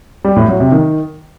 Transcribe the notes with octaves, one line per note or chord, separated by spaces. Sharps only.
G3
A2
F#3
C3
D#3